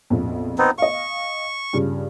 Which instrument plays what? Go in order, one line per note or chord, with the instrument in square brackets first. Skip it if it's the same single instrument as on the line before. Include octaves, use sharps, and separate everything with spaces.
[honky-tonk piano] A#1 F2 B2
[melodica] B3 C4 D#4
[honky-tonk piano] D#5 F5 [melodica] C#6
[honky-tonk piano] G2 C#3 F4